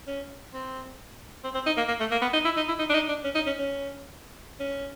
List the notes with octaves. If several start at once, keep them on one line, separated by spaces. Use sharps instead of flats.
C#4
C4
C4
C4
D#4
A#3
A#3
A3
A#3
B3
D#4
E4
D#4
E4
D#4
D4
D#4
D4
C#4
D#4
C#4
C#4
C#4